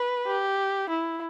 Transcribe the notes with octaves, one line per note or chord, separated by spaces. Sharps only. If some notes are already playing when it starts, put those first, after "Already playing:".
Already playing: B4
G4
E4